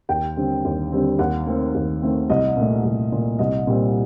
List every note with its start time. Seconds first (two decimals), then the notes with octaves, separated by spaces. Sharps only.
0.09 D#2 G5
0.36 D3 G3 C4
0.65 D#2
0.92 D3 G3 C4
1.19 D#2 F#5
1.47 D#3 A3 C4
1.75 D#2
2.02 D#3 A3 C4
2.30 C2 D#5
2.57 A#2 A3
2.84 C2
3.12 A#2 A3
3.39 C2 D#5
3.67 A#2 G3 C4